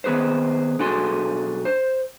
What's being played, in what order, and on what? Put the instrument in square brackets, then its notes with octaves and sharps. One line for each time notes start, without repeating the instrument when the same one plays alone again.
[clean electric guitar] D#3 B3 G#4 B4 C5
B1 D4 F#4 G#4 A4 C6
C5